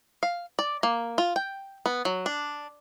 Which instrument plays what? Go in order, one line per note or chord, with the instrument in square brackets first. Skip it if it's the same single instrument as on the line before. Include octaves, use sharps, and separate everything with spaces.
[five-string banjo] F5
D5
A#3
F4
G5
B3
F#3
D4